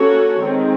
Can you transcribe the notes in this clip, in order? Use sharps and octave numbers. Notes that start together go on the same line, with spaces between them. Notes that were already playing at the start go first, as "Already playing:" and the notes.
Already playing: A#3 C#4 F#4 A4 C#5
D#3 G#3 C4